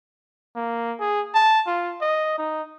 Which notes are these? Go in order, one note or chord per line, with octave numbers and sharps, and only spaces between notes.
A#3
G#4
A5
F4
D#5
D#4